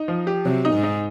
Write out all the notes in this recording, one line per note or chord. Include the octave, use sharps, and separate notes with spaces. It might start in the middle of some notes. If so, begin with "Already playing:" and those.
Already playing: D#4
F3
G4
C3 F#3
D#4
G#2
D#4